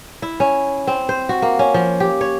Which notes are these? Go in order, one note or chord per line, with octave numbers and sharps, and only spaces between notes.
E4
C#4
C4
C5
F#4
A#3
C#4
F3
G4
C#5